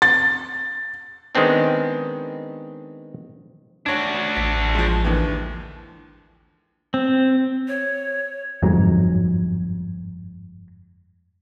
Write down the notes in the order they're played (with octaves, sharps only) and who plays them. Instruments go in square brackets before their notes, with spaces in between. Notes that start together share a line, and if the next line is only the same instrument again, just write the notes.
[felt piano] A6
[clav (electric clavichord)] D#3 G#3 B3 C4 D4
[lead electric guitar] D4 F#4 [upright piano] C#5 G#6
[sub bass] A1 [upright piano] B6
[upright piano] F3 G#3
D#2 D3 E3
[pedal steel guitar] C4
[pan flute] C#5
[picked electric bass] G1 F2 G#2 F#3